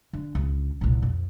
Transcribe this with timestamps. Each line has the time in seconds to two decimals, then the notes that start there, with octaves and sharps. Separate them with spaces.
0.13 D3
0.35 C#2
0.81 C2 A#2
1.02 F2